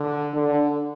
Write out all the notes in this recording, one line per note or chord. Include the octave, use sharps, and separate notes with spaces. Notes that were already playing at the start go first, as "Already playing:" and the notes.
Already playing: D3
D3